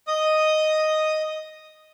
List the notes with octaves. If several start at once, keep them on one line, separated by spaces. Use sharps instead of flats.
D#5 D#6